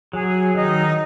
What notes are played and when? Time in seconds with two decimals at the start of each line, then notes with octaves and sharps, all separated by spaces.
0.13 F#3 G#4
0.55 D#3 D#4